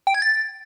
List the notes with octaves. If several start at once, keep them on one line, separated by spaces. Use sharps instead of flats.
G5
G#6
A6